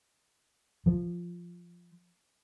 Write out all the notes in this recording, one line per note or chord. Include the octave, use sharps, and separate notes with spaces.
F3